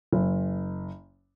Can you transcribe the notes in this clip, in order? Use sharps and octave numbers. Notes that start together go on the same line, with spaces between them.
F#1